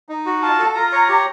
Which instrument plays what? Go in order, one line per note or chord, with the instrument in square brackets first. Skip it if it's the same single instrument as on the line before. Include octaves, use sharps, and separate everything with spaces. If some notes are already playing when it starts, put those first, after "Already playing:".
[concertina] D#4
F#4
[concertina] F4 [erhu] A5
[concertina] A4
[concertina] F4 [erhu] A#5
[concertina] C#5
G4